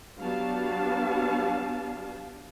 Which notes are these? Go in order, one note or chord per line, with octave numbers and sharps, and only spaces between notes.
F#3 B3 D4 G4 F5 A5